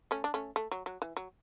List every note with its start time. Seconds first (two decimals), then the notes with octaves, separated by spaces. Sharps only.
0.11 A3 C#4
0.24 D4
0.34 A3 C#4
0.56 A3
0.71 F#3
0.86 F#3
1.02 E3
1.17 F#3